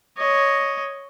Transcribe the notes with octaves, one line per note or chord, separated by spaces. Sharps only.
C#5 D#5